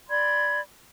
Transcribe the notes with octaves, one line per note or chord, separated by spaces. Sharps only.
D5 B5 C6 G#6